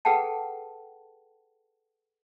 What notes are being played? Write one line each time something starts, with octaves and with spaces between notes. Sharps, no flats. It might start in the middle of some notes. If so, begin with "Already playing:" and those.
G#4 A4 B4 F#5 G5 A5